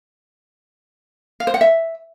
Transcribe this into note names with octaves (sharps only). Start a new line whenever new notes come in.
F5
C5
F#5
E5